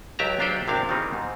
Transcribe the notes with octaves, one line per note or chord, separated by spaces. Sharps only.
C#2 F#3 G4 E5 A5 A#5
F#3 D4 F4 G4 C5 F#5
G#1 C3 C4 D4 E4 F5
D#3 E3 G3 C4 C#4 D#4
G#2